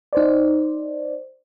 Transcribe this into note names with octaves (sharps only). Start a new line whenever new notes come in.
D#4 C5 D5